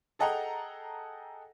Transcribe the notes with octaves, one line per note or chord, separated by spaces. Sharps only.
G#4 A4 D#5 F#5 G5 A#5